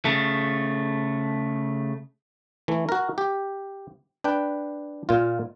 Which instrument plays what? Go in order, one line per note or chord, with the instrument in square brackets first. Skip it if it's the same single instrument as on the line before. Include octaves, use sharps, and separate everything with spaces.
[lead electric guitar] C#3 A3
[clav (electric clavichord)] E3 A3
F#4 A#4
G4
D4 B4 G5
A#2 F4